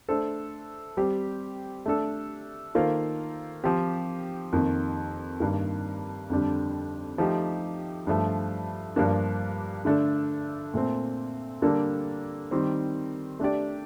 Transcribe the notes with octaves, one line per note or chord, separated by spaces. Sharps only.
A3 D4 A4 C5
G3 C4 G4 C5
A3 D4 A4
D#3 A#3 F4 A4 C5
F3 C4 G4
F2 D#3 A#3
G2 D#3 A#3
F2 D3 G3 D4
F3 A3 D#4 G4
G2 F3 A3
G2 F3 A#3 D4
D3 A3 D4 A4
A#2 A3 C4
D3 G3 A#3 D4 A4
D#3 G3 C4
A3 D4 G4 D5